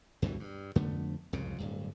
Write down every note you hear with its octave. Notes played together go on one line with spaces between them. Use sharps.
D2 G2 B2 E3
G2
F2 D3 A3 B3
C2 F2 G#2 C#3
D1 G2